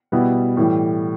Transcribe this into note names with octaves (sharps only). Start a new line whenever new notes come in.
B2 G3 B3 E4
A2 E3 G3